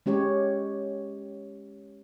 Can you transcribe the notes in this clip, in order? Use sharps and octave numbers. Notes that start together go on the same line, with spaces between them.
G#3 C#4 G4 C#5